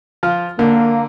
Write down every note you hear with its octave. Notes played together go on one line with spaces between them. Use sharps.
F3 F4 F6
D3 A#3